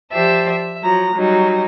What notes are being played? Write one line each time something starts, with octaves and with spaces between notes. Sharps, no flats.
F3 G4 C5 D5 E5 A5
E5
F3 F#3 A#5
F#3 G3 D#4